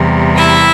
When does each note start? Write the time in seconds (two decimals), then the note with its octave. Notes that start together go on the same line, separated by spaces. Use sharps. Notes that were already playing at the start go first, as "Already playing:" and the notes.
Already playing: E2 C3 G3
0.38 E4 E5